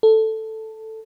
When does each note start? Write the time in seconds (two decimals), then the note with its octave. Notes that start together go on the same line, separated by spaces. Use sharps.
0.03 A4